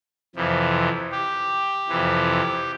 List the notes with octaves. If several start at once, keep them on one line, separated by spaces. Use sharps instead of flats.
F2 C3 E3
G4
F2 C3 E3